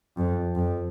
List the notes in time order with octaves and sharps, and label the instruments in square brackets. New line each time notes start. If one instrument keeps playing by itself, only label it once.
[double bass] F2
F2